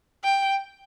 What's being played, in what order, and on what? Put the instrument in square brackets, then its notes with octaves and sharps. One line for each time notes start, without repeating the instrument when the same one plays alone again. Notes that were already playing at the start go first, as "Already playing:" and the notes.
[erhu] G5